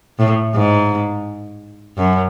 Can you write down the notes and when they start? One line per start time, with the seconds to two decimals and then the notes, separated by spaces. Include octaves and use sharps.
0.19 A2
0.54 G#2
1.97 F#2